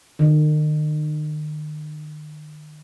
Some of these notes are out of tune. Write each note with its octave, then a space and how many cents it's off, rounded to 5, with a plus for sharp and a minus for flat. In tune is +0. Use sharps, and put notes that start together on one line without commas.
D#3 -40